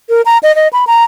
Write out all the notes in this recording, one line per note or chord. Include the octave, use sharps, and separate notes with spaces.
A#4
A#5
D#5
D#5
B5
A#5